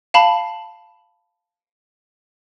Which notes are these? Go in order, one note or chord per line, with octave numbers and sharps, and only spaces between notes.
F5 A5 B5